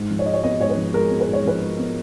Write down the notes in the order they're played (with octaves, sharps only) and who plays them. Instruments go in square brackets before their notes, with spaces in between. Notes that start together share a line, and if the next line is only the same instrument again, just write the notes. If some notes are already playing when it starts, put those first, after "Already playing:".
Already playing: [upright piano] G#2
F3
C#5
G#3 D#5
C#5
B3 D#5
G#2 C#5
B4
F3
G#3 A#4
B3
B4
G#2
C#5
F3 B4
G#3
B3